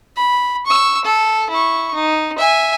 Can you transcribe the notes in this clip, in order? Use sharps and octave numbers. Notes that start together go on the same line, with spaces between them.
B5
C#6 E6
A4
E4 C#6
D#4
E5 G#5